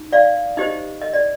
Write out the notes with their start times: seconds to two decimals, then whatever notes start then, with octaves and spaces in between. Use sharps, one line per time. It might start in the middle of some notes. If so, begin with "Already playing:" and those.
Already playing: D#4
0.13 D5 F5
0.57 D#4 G4 C5 D#5
1.01 D#5
1.13 D5